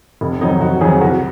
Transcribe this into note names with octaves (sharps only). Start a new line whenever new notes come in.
F1
F2 D#3 F#3 D#4
F1 F#4
F2 D#3 F#3 G#4
C2 F#4